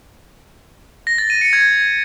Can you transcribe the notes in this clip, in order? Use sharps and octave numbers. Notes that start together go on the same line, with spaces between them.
A#6
A6
D#7
C#7
G#6